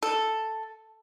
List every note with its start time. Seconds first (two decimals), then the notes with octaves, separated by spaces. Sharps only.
0.03 A4